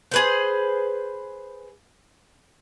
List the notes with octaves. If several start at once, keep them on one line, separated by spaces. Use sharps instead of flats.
G#4 B4 C5